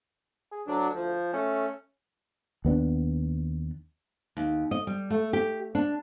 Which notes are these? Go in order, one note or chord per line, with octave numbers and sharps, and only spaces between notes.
G#4
D2 F#3 D4
F3
A3 C#4
D#2 B3 C#4 D4
D#2
D#5
G3
A3
G4
D4